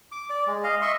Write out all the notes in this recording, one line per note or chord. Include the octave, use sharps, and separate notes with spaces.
D6
D5
G#3
D#5 F5
D#5 E5 C6 C#6